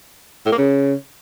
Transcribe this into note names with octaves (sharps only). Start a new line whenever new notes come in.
A2
A#3
C#3